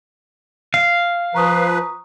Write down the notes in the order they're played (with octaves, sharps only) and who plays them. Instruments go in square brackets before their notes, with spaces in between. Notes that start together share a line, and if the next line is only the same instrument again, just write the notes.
[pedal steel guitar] F5
[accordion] F3 B4 [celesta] A#5 C#6 D#6